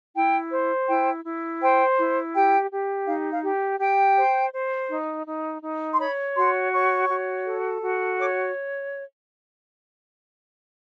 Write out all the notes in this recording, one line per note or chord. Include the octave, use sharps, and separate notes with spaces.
E4 G5
C5
E4 G5
E4
C5 G5
E4
G4 G5
G4
D#4 F5
F5
G4
G4 G5
C5
C5
D#4
D#4
D#4
C6
C#5 B5
F#4 C6
C#5 C#6
F#4
A4
F#4
C#5 D6